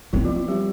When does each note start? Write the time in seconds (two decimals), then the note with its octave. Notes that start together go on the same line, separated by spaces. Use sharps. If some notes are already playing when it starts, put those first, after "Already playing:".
0.13 E3 C4 E4
0.25 F3 F4
0.36 F3 F4
0.48 G3 G4